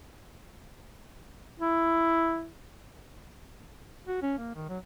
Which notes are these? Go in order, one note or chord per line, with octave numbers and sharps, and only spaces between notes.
E4
F#4
C#4
A#3
D#3
F#3